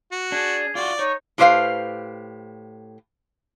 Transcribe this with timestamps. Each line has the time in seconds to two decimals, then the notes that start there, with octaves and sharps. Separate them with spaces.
0.12 F#4
0.32 D4 G#4
0.75 F4 F#4 D5
0.99 D#4 C#5
1.38 A2 G4 B4 C5 E5 F5